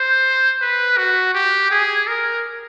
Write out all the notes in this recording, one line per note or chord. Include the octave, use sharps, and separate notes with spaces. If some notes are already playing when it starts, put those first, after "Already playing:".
Already playing: C5
B4
F#4
G4
G#4
A#4